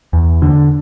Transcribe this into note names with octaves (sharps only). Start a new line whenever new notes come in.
E2
D3